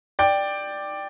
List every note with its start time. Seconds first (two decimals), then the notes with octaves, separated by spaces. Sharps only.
0.19 D5 G5